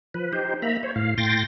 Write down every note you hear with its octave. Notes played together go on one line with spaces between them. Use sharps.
F3 B4
D#4 G4 C5
A#3 E5 A#5 B5
C5 C#5
A2 F5
A2 G5 C6 A6 A#6